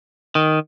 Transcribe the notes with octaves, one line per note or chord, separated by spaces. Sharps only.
D#3